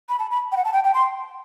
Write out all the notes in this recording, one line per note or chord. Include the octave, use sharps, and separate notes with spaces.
B5
A5
B5
G5
F#5
A5
G5
G5
C6